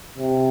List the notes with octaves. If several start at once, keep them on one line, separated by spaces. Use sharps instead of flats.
C3